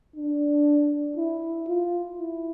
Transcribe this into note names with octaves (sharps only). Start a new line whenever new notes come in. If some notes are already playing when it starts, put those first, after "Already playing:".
D4
E4
F4
E4